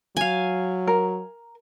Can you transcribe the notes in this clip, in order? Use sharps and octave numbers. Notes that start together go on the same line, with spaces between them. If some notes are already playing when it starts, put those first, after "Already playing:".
F#3 F5 G#5
A#4